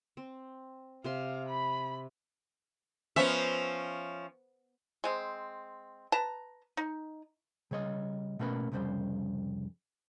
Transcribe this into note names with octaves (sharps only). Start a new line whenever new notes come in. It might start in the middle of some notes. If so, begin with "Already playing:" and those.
C4
C3 C5 F5 C6
B5
F3 B3 C#4 C5 E5
G#3 C4
B4 A5 A#5
D#4
C#3 G3 C#5 D#5
B2 A3 A#3 C#4 B4 B5
C2 F2 C#3 G3 C5